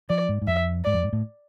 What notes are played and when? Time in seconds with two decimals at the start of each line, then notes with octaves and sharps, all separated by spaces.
0.10 F3 D5
0.29 G#2
0.42 G#2
0.47 F2 E5
0.84 G#2 D5
0.94 F2
1.03 G#2
1.13 A2